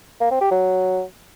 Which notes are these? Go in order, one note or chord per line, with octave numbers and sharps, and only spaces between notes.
A#3
C4
G4
F#3